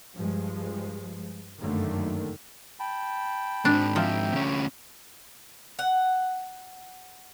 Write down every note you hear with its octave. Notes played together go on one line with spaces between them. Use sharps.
G2 F3 G#3
G1 F#2 D3 D#3 A3 A#3
G5 A5 B5
G#2 C4 D4
F3 E5 G5 A#5
D2 C#4
F#5